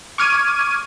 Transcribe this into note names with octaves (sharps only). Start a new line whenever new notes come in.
C#6 D6 F6 G#6 D#7